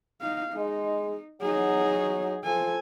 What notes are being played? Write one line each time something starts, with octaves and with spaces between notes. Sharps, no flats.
D#4 F5
G#3 D#4
F#3 D#4 G#4
F3 A4 G#5